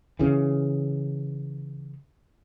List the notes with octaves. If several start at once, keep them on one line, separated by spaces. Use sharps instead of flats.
C#3 E3